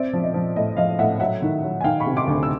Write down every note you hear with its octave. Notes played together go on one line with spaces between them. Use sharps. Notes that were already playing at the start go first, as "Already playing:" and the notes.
Already playing: C4 D5 E5
F3
D#5
F3
A2 D#5
F3 D#5 F5
A2 E5 F#5
F#3 E5 F#5
D#3
F#3
G#5
D#3 F5 G5
B5 C#6
C3
C6 D6
D2
E6